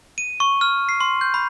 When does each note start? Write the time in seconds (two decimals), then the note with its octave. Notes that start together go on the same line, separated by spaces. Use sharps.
0.18 D#7
0.40 C#6
0.61 F6
0.89 C7
1.01 C6
1.21 G6
1.34 B5